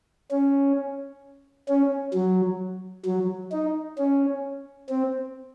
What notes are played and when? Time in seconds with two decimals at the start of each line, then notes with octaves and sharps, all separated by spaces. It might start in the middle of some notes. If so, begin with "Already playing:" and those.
0.31 C#4
1.69 C#4
2.14 F#3
3.05 F#3
3.52 D#4
3.98 C#4
4.89 C4